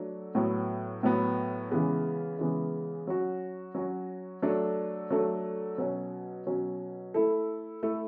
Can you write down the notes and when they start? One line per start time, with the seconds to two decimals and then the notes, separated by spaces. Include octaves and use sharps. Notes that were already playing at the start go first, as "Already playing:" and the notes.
Already playing: F#3 A3 D4
0.35 A2 F#3 B3
1.03 A2 F#3 B3
1.71 C#3 E3 G#3 B3
2.39 C#3 E3 G#3 B3
3.07 F#3 C#4 F#4
3.75 F#3 C#4 F#4
4.42 F#3 A3 D4 A4
5.11 F#3 A3 D4 A4
5.78 B2 F#3 C#4
6.46 B2 F#3 C#4
7.14 A3 E4 A4
7.83 A3 E4 A4